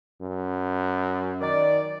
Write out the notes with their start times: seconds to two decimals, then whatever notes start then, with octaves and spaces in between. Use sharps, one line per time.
0.22 F#2
1.41 D#3 D5